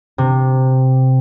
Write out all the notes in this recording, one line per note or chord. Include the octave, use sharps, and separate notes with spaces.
C3